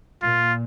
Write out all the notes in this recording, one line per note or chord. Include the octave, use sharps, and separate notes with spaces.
A#2 F4